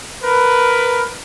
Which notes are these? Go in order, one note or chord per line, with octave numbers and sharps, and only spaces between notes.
A#4 B4